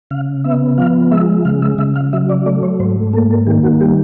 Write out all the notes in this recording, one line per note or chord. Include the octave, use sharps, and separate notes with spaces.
C#3 F5
B3 E5
F3 F5
G#3 E5
C#3 F5
E5
C#3 E5
F5
F#3 E5
D5
A3 D5
C#5
G#2 C5
A#3 A4
A4
D#3 G4
F#4
G3 G4